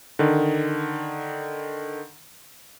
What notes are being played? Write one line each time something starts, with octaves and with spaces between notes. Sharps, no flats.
D3 D#3